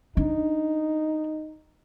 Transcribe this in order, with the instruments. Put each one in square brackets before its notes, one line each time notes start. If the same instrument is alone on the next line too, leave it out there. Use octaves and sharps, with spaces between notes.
[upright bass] D4 [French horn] D#4